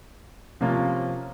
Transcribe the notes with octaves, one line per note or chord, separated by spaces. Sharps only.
C3 F3 A#3 C#4 F4